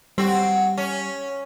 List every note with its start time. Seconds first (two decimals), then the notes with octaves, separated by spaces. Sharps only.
0.18 G3 C4 F#4
0.78 C#4